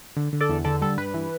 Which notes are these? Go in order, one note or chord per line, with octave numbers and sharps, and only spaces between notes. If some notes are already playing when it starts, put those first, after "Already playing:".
D3
D3
A4 D5
E2
D3 A4 D5
G3 A4
G2 B4
E3